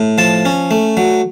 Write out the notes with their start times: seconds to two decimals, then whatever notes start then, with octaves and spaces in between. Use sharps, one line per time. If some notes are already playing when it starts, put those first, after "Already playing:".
Already playing: A2
0.18 F3 A5
0.45 C#4
0.71 A3
0.97 F#3